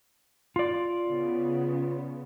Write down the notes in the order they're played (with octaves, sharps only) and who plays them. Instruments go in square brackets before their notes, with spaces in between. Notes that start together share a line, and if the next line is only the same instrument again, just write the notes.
[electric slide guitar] F4 D5
[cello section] C#3 B3